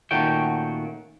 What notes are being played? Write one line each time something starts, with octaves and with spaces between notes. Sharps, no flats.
A#2 D#3 A3 C#4 F#4 G5